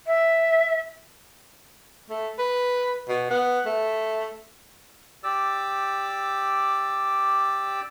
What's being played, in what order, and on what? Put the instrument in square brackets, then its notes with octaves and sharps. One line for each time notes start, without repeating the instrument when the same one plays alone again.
[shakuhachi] E5
[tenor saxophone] A3
B4
B2
B3
A3
[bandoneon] G4 D5 D6 E6